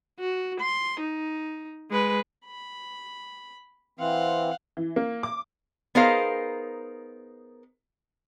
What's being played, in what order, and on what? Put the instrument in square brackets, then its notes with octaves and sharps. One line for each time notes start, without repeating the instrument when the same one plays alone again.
[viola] F#4
C6
D#4
G#3 B4
[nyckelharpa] B5
[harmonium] E3 C4 [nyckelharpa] F5 F#5
[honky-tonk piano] E3
A#3
D6
[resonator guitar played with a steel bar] B3 D#4 G#4 A#4 C5 F5